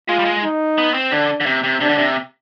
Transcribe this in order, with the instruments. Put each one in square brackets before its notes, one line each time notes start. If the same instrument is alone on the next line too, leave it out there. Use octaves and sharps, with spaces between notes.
[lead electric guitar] G#3 [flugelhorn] F4
[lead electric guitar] G3
G#3
[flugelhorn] D#4
[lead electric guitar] B3
C4
[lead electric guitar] D3 [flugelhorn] D4
[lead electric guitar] D3
C3
C3
[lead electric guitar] C3 [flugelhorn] D4
[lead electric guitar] D3
C3